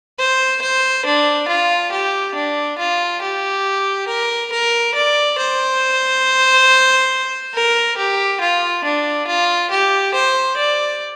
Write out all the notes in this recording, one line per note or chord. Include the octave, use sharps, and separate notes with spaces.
C5
C5
D4
F4
G4
D4
F4
G4
A#4
A#4
D5
C5
A#4
G4
F4
D4
F4
G4
C5
D5